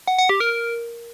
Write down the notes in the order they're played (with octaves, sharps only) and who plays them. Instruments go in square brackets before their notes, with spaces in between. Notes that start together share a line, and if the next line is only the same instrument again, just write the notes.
[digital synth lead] F#5
F#5
G4
A#4